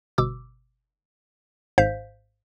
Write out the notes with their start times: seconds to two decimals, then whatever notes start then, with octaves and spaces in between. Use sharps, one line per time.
0.18 G1 B2 D6 E6
1.78 G#1 G#2 C5 F5 G6 B6